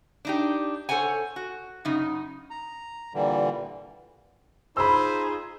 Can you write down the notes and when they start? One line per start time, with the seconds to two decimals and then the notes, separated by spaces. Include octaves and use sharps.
0.25 D4 D#4 G4
0.89 A4 C5 C#5 F#5 G#5
1.36 F#4
1.85 F#2 C#3 D#4
2.50 A#5
3.14 A#2 D3 E3 G3
4.77 D#4 F4 G#4 C5 B5 E6